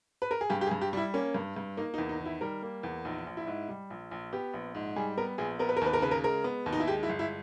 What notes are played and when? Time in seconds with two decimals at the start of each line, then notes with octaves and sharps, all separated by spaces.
0.22 B4
0.31 A#4
0.41 G#4
0.50 G2 G4
0.61 G4
0.66 G#4
0.71 G2
0.81 G4
0.93 G3 E4
1.14 A#3 C#4
1.34 G2
1.56 G2
1.77 A#3 D#4
1.94 D#4
1.98 E2
2.09 D#4
2.19 D#3
2.25 E4
2.41 G3 A#4
2.62 A#3
2.83 E2
3.05 A#1 D#4
3.27 A#1
3.37 E4
3.47 G#2
3.69 G3
3.90 A#1
4.11 A#1
4.33 B3 G4
4.54 A#1
4.75 G#2
4.96 G3 G#4
5.17 B3 A#4
5.38 A#1 G#4
5.59 B3 A#4
5.69 B4
5.77 A#4
5.81 D#2 B4
5.93 A#4
6.02 C#3 B4
6.11 A#4
6.24 G#3 A#4
6.44 B3
6.66 D#2
6.73 D#4
6.80 E4
6.88 G#3 G4
7.03 E4
7.09 G1
7.19 E4